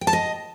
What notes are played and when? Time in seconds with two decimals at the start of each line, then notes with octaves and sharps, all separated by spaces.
0.01 G5
0.07 A5
0.13 D#5